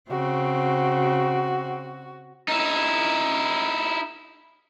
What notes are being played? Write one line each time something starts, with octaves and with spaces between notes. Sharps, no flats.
C#3 C4 F#4
D#4 E4